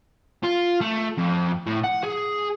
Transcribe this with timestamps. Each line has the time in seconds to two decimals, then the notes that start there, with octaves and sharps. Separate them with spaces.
0.43 F4
0.81 A3
1.18 F2
1.67 A2
1.84 F#5
2.03 G#4